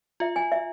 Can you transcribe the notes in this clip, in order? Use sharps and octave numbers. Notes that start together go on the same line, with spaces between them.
F4 E5
G#5
E5